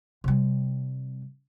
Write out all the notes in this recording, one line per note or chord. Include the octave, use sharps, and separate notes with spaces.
C3 G3